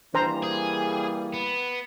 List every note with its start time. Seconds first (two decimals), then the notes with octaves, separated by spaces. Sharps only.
0.14 E3 G3 A#3 D4 C5 A#5
0.43 G#4
1.33 B3